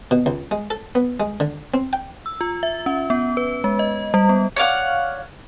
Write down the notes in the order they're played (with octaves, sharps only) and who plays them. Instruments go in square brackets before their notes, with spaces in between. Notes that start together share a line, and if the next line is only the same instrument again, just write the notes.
[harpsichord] B2
C#2
G#3
A4
B3
G#3
D3
C4
G5
[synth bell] E6
F4
E5
C#4
B3
B4
G#3
D#5
G3
B3
[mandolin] C#5 D5 F5 F#5